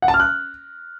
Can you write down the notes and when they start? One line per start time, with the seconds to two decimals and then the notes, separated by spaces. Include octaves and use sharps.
0.02 F#5
0.08 A5
0.14 F6
0.20 F#6